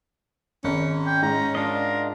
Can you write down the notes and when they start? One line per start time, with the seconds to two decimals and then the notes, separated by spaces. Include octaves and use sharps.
0.64 G#1 C#4
1.07 G5
1.22 G#2 A#5
1.55 D4 F4 A#4 D#5